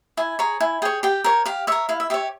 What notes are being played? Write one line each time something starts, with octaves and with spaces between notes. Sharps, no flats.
E4 G#5
G#4 C#5 A#5
E4 G#5
G#4 C#5 G5
G4 G5
A#4 C#5
G4 F5
A#4 C#5 E5
E4 F5
E5
G4 C#5 E5